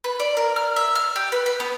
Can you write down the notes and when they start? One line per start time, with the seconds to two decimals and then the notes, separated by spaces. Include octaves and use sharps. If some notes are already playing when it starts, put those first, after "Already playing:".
0.04 B4
0.20 D5
0.37 A#4
0.56 F6
0.76 E5
0.95 F6
1.16 G4
1.32 B4
1.46 B4
1.60 B3